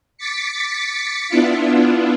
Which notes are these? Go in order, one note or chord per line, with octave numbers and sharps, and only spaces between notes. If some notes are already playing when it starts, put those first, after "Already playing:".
D6 A6 B6 C#7
B3 D4 E4 F4